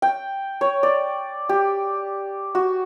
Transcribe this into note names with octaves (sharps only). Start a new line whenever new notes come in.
G5
C#5
D5
G4
F#4